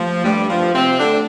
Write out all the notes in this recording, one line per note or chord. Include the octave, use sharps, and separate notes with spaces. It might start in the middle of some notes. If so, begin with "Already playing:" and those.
Already playing: F3 A3 G4
G2 G3 A3
F3
A3
C3 C4
D3 D4 A4